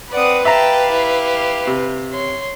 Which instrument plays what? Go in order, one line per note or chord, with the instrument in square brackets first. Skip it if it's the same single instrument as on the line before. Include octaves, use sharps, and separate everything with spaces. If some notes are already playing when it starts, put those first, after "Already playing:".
[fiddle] C4 F#5 [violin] B4 [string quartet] D5 D#6
[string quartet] G4 F5 [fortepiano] E5 A#5 [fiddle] G5 A5
[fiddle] E4
[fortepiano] C3
[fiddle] C#5 C6